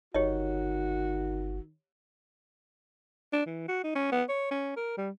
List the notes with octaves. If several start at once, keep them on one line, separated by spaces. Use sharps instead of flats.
G1 D#3 F#4 G4 C#5 D#5
D4
E3
F#4
D#4
C#4
B3
C#5
C#4
A#4
G3